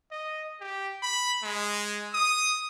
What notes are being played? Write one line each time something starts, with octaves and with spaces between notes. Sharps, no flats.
D#5
G4
B5
G#3
D#6